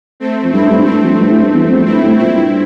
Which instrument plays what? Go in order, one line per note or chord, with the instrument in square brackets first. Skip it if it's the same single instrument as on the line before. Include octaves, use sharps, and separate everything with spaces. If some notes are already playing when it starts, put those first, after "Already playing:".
[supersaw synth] A3 C4
[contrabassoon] F2
[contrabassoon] G2 [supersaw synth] C4 E4
[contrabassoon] G2
A2
[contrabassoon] G2 [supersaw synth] A3 C4
[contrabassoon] F2
G2
A2
G2
E2
F2
[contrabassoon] G2 [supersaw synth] C4 E4
[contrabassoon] A2
[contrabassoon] A#2 [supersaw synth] C4 E4
[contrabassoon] G2